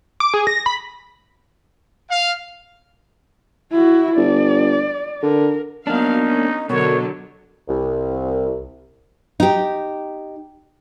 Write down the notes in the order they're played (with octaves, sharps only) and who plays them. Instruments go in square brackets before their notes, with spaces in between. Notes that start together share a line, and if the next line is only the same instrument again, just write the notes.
[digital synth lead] D6
G#4
A#6
B5
[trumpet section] F5
[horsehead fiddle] E4 F#4
[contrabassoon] G1 [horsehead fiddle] D5
[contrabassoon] D3 [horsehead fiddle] A#4
[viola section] F#3 F5 [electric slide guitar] A#3 D4 [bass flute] B3 [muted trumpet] D#4
[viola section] C#4
[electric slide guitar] B2 [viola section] D3 F#3 A4 [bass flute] A#4 [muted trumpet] C#5
[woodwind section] C2
[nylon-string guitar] D#4 G4